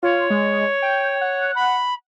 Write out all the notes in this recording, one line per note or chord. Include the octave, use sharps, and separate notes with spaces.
F4 C#5
G#3
G5
F#5
B5